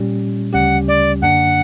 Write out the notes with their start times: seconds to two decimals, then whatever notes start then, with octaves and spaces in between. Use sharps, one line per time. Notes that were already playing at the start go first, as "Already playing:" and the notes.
Already playing: A#2 G3 C#4 G4
0.53 D2 C#3 G3 C#4 G4 F#5
0.88 D5
1.22 F#2 D3 A#3 D4 F#5